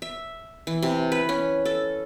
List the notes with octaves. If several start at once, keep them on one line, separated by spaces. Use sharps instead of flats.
E5
E3
C3
B4
C#4
A4